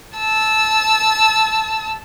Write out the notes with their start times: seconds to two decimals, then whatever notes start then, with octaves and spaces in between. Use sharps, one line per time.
0.18 A5 E6